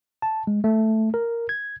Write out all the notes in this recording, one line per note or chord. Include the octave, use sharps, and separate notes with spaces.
A5
G#3
A3
A#4
G#6